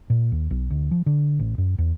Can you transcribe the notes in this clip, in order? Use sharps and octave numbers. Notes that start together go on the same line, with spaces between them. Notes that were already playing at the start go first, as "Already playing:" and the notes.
A#2
D#2
B1
D2
F3
D3
A1
F#2
E2